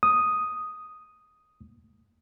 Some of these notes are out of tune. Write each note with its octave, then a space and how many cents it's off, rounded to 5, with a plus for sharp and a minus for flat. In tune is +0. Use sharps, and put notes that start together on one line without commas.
D#6 +0